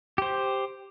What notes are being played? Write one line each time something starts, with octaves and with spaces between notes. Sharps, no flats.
G4 C5